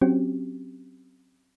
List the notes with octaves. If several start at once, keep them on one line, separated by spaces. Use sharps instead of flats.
F#3 C4 C#4 F#4 G4